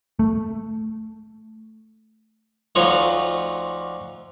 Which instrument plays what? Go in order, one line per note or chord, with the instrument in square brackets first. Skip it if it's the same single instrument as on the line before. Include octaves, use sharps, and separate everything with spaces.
[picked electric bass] A3
[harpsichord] D2 F3 D#4 F4 C#5 F#5